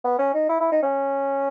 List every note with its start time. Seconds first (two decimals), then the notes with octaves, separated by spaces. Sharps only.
0.04 B3
0.19 C#4
0.34 D#4
0.49 E4
0.60 E4
0.72 D#4
0.83 C#4